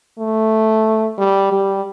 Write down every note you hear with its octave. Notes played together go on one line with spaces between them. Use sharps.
A3
G3
G3